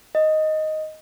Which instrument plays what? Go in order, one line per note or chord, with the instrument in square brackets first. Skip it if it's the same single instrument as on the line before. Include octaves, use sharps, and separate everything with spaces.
[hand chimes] D#5